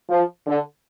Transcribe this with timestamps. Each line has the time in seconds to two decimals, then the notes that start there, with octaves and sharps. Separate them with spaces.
0.10 F3
0.47 D3